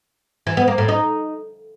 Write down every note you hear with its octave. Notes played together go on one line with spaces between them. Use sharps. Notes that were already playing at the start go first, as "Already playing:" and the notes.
E3
B3
A#3
A2
D#4